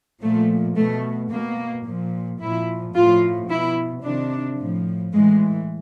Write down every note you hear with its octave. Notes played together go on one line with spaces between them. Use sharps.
A#2 F3 A3
B2 A3
B2 A#3
A#2 F3
A#2 F3 E4
A2 F3 F4
B2 E4
C3 D#3 D4
A2 F3
A2 E3 G#3